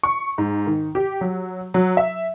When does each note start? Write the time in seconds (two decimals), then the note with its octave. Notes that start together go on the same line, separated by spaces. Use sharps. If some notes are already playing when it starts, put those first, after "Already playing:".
0.03 C#6
0.38 G#2
0.67 D#3
0.95 G4
1.21 F#3
1.74 F#3
1.97 E5